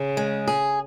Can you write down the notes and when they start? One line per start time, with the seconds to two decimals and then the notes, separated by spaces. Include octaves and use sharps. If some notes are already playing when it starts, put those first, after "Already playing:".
Already playing: C#3
0.17 G#3
0.48 G#4